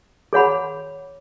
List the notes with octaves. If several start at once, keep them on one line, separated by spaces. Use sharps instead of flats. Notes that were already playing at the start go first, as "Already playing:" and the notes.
G#4 C#5 F#5 B5